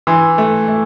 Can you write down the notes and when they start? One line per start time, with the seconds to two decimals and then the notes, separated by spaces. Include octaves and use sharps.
0.07 E3 C6
0.38 A3
0.68 A3